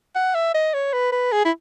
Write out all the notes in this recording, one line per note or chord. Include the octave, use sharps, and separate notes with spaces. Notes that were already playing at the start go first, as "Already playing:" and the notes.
F#5
E5
D#5
C#5
B4
B4
G#4
E4